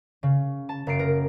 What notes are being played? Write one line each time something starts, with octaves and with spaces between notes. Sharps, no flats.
C#3
A5
F#1 A#5 C7 D7
A#4